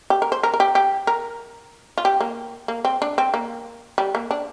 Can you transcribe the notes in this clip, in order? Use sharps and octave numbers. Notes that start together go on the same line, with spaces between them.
G4
A#4
C5
A#4
A#4
G4
G4
A#4
F4
G4
A#3
A#3
C4
D4
C4
A#3
G3
A#3
D4